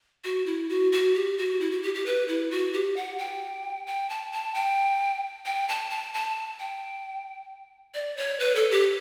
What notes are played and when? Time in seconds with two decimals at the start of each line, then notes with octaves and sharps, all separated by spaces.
0.24 F#4
0.46 E4
0.69 F#4
0.92 F#4
1.15 G4
1.38 F#4
1.61 E4
1.71 F#4
1.83 G4
1.95 G4
2.06 B4
2.28 E4
2.51 F#4
2.73 G4
2.96 F#5
3.18 G5
3.87 G5
4.10 A5
4.32 A5
4.55 G5
5.45 G5
5.69 A5
5.90 A5
6.14 A5
6.60 G5
7.94 D5
8.17 C#5
8.40 B4
8.55 A4
8.71 G4